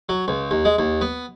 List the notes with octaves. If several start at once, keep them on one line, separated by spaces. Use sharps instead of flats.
F#3
C#2
D#2
G#3
D#2
B3